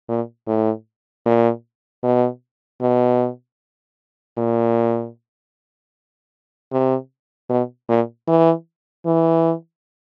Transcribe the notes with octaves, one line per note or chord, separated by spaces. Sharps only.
A#2
A2
A#2
B2
B2
A#2
C3
B2
A#2
E3
E3